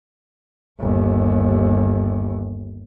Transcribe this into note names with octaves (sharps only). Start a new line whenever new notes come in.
G1 D#2